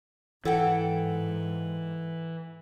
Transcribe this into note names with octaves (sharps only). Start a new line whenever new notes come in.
G#2 E3 A4 F#5 G5